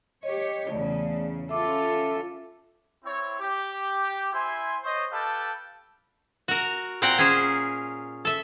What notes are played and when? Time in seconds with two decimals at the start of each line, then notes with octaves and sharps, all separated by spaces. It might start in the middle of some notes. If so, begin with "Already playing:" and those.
0.23 G4 C#5 D#5
0.70 E2 C#3 A3 D5
1.49 C#4 F4 A4 E5 D6
3.04 C4 E4 C#5
3.40 G4
4.33 E4 C5 E5 G#5 C6
4.84 C5 C#5 D#5
5.12 G4 A4 B4 F5 G5 A5
6.48 F#4 A#4
7.02 A#2 C4 A#4 F#5 G5
7.18 C#4 G#4 C5
8.25 A4 E5